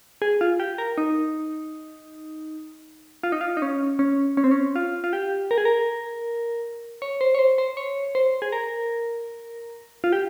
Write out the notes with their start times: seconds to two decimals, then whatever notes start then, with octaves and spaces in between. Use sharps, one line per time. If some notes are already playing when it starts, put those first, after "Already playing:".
0.22 G#4
0.41 F4
0.60 G4
0.78 A#4
0.98 D#4
3.23 F4
3.32 D#4
3.41 F4
3.57 D#4
3.62 C#4
3.99 C#4
4.37 C#4
4.44 C4
4.51 C#4
4.76 F4
5.04 F4
5.13 G4
5.51 A#4
5.58 G#4
5.65 A#4
7.02 C#5
7.21 C5
7.35 C#5
7.39 C5
7.58 C5
7.77 C#5
8.15 C5
8.42 G#4
8.52 A#4
10.04 F4
10.12 G4